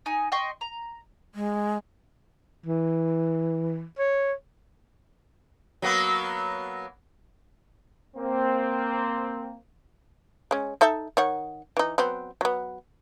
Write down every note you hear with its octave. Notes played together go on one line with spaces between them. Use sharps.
D#4 G#5
D#5 G5 C6 C#6
A#5
G#3
E3
C#5
F#3 A#3 B3
A#3 C4
G#3 C#4
D#4 A4 E5
D#3 C#5 F#5
E3 D#4
F#3 B3 C4
F#3 B3